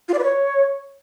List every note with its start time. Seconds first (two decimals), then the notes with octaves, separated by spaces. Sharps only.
0.09 F4
0.14 D5
0.19 B4
0.24 C#5